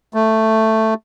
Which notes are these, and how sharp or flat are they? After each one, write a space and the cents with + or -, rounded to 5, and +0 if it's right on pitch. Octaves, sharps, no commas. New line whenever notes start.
A3 +5